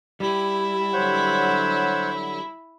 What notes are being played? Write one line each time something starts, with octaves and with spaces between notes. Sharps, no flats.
G3 E4
D3 F#3 C5 C#5 F#5